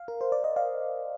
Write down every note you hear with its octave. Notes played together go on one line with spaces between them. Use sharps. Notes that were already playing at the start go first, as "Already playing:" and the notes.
Already playing: F5
A#4
C5
D5
D#5
D5 F5